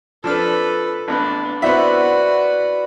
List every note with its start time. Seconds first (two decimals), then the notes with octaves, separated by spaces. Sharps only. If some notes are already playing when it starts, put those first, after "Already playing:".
0.24 F3 D4 A4 B4 F6
1.08 A1 B3 D4 B4
1.62 B3 E4 F#4 B4 C5 D5 E5 F#5